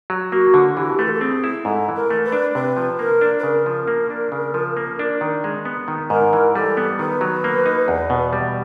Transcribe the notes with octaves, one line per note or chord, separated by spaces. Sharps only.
F#3
A#3 F#4
D3
E3 G4
A3 B4
A#4
A4
C4 G#4
E4
G#2 A4
E3
A#4
A3
B4
D4
C3 B4
F3
A#3 A#4
D4
B4
C#3 A#4
F3
A#3
D4
C#3
F3
A#3
D4
D#3
G#3
B3
D#3
G#2 A#4
E3
G3 A4
B3
D#3 B4
F#3
A#3
D#4
E2
B2
G3